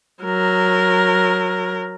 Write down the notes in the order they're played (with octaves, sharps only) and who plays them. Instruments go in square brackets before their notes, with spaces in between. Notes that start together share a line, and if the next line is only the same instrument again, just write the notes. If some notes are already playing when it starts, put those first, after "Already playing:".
[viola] F#3 A#4